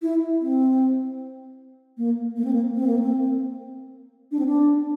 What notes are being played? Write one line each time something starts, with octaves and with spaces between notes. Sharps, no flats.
E4
C4
A#3
A#3
C4
A#3
C4
A#3
C4
D4
C4
D4